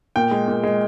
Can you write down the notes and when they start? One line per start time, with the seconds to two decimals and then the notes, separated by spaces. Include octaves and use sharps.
0.16 A#2 G5
0.31 G#3
0.48 A#2
0.63 G#3